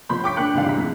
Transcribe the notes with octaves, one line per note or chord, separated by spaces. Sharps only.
G1 F3 B5 C6 G6
C#5 G5 C#6 D6 G6 B6
D3 D4 G5 F#6 C#7 D7
G#1 C#3 E3 G3 D4 F5
C2 G#2 D3 E4 A#5 B6
F2